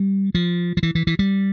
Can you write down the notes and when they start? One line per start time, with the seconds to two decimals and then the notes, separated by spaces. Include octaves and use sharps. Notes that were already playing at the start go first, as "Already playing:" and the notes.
Already playing: G3
0.35 F3
0.77 F3
0.83 E3
0.95 E3
1.07 E3
1.19 G3